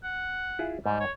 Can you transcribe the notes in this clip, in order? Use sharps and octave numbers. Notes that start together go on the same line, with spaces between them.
F#5
E4 F4 G#4
G#2 G3
C#5